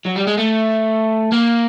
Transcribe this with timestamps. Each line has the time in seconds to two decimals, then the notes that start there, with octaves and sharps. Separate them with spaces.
0.06 F#3
0.16 G3
0.28 G#3
0.38 A3
1.32 A#3